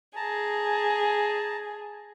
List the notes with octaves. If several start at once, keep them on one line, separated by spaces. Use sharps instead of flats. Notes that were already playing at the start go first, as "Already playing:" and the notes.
G#4 A5 A#5